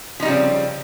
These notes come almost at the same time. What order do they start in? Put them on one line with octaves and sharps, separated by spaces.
F3 D#4 G3 C#3 C4